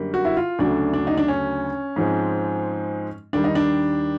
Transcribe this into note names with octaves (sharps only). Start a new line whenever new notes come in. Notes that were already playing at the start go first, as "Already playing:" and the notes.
Already playing: F#2 D3 G3 A#3
F#4
E4
F4
D2 C#3 F#3 A3 D4
D4
D#4
D4
C#4
G#2 F3 G#3 C4
D#2 D#3 G3 D4
D#4
D4